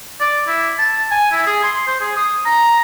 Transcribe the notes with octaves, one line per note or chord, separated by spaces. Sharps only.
D5
E4
A5
G#5
E4
G#4
C6
C5
G#4
D#6
A#5